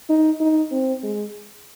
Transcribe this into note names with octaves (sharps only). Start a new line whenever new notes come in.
D#4
D#4
C4
G#3